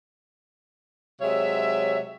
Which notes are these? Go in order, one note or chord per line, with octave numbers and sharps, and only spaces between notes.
C3 F#3 G#3 C#5 E5